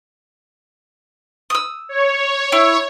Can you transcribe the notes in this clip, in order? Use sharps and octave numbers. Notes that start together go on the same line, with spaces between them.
D#6 E6
C#5
E4